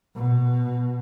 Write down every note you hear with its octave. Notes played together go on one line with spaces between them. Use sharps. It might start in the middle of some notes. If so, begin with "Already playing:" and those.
B2